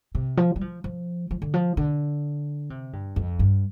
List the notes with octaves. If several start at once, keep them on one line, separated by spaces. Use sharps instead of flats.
C3
F3
G3
F3
F3
F3
D3
F3
D3
C3
G2
F2
G2